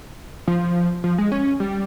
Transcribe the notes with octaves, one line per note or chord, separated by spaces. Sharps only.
F3
F3
G#3
C#4
G3